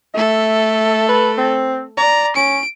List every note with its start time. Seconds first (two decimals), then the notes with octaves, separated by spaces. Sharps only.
0.14 A3 A4 E5
1.09 B4
1.38 C4
1.97 D5 A#5
2.36 C#4 D7